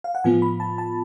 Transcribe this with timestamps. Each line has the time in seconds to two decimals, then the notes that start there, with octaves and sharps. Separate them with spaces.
0.04 F5
0.15 F#5
0.24 A2 F3 B3 F4 G#5
0.42 B5
0.60 A5
0.78 A5